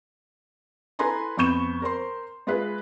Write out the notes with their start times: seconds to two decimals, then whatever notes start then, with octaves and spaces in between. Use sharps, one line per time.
0.99 E4 A4 B4 G#5 A#5 C6
1.37 F2 B3 C#6 G6 E7
1.82 A#4 C5 C6
2.47 G#3 F4 G#4 B4 E5